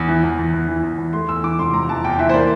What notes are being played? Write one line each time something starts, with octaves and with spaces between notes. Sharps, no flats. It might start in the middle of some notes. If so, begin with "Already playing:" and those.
Already playing: E2
E3
E2
E2
E2
E3
E2
E2
A3 C6
E2 E6
E3 D6
F1 C6
F1 A#5
E3 A5
E2 G5
E3 E5
C5
A#3 D5